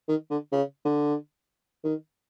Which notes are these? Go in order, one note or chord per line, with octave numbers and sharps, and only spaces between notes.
D#3
D3
C#3
D3
D#3